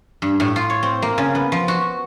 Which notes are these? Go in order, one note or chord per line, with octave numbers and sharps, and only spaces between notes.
G2
A2
F4
C#5
C4
A#3
C#3
B3
F3
F#4